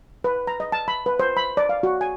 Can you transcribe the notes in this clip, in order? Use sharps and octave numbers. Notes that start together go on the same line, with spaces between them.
B4
A#5
D#5
A5
B5
B4
C5
B5
D5
F5
F#4
G#5